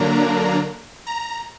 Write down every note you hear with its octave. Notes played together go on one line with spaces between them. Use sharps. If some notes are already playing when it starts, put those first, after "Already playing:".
Already playing: D3 F#3 A#3 D4 A#5
A#5